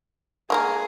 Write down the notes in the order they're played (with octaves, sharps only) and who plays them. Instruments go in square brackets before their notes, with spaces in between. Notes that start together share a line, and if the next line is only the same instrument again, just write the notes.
[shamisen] G#3 A#3 A#4 [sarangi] G#4